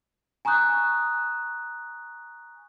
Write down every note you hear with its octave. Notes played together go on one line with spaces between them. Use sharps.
G#5 A#5 C#6 D#6 F#6 G6